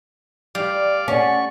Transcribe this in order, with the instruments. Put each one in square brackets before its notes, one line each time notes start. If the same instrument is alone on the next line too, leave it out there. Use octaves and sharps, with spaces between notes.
[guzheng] G3 [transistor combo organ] D5 F5
[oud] C#4 [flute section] D5 F#5 [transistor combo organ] C#6